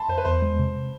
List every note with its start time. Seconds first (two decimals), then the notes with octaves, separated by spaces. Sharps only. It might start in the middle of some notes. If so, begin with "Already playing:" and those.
Already playing: A5 B5 C6
0.09 F2 C5
0.18 B4
0.25 E2 C5
0.42 G#3
0.59 C3